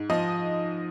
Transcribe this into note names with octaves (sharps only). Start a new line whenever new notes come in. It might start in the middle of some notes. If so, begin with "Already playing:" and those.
Already playing: G#2
F3 D#5